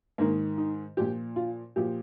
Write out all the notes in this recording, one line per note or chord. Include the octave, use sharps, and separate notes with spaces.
G#2 D#3 A#3
D#4
A#2 F3 G4
F4
A#2 F3 G4